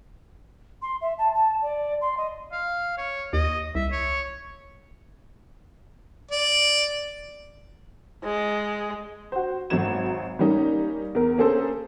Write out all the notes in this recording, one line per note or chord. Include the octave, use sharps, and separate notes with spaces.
C6
E5
A5
A5
D5
C6
D#5
F5
C#5
D#2 D#5
C2 E5
C#5
D5
G#3
F#4 C5
G#1 F#3 G#6 E7
G3 A#3 C#4 D#4
E2 A#4
A#3 C#4 G#4 A4 C5